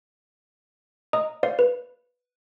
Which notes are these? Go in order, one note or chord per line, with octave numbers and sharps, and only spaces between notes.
D#5 A#5 D#6
C5 D5 F5
B4